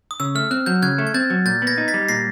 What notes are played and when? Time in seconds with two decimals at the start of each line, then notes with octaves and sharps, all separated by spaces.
0.11 D#6
0.20 C#3 E6
0.35 A3 F6
0.51 C4 F#6
0.66 F#3 G6
0.82 C#3 F#6 G#6
0.98 A3
1.07 G#6
1.14 C4 G6 A6
1.30 F#3
1.45 A#2 G6 A6
1.62 B3
1.67 G#6 A#6
1.78 D#4
1.88 A6 B6
1.94 G3
2.09 A#2 A#6 C7